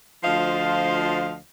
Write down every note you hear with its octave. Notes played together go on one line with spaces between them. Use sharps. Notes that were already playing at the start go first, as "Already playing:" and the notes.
D2 F3 F4 C5 D#5 F5